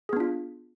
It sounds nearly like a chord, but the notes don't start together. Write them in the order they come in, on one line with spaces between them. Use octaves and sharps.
G#4 B3 D4 F4